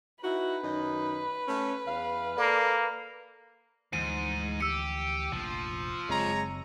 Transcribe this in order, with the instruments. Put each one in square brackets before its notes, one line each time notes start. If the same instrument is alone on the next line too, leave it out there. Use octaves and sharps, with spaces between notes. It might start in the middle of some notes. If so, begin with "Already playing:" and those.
[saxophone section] D#4 E4 F#4 [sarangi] B4
[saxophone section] F#2 D#3 D#4
A3 C#4
E2 F5
[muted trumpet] A#3 [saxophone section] A4 D5
[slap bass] D2 E3 F3 [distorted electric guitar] G#2 [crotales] D#7
[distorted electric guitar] G4 [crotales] E6 C#7
[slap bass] F1 A#1 [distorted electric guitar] F3
[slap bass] F#1 C4 [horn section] G#3 C#5 A#5